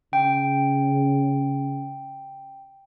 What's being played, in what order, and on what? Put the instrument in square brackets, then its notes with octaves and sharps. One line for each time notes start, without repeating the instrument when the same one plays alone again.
[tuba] C#3 [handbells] G5